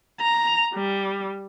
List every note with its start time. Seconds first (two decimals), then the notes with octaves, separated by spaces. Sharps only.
0.20 A#5
0.74 G3